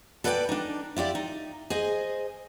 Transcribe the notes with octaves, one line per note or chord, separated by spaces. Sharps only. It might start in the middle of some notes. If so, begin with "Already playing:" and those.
A4 B4 D5 D#5 G5 G#5
D4 D#4
E4 F4 G4 D5
D#4
G#4 C5 D#5 G#5